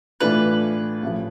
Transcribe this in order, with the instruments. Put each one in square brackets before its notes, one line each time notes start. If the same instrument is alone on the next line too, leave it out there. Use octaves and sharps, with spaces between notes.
[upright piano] A2 E3 A3 D4 F4 [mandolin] B4
[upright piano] A1 A2 F3